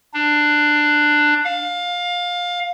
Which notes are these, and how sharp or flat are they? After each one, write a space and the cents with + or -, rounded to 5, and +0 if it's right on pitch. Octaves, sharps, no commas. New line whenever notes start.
D4 +15
F5 +20